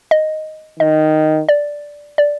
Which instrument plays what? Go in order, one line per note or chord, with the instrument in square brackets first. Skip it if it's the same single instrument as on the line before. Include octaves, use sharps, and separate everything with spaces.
[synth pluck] D#5
[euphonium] D#3 [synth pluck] D#5
[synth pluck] D5
D5